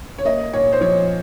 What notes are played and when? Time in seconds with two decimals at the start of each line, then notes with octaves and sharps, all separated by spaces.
0.18 C#5
0.25 A#3 D#5
0.53 A#2 C#5
0.72 C5
0.81 F3 C#5